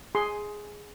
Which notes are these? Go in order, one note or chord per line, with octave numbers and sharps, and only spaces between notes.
G#4 C6